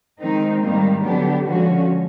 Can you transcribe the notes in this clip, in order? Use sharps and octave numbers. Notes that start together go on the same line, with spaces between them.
D#3 G#3 C4 D#4
G#2 D#3 G3 A#3
D3 F#3 B3 D4 G4
D3 F3 G#3 C#4 F#4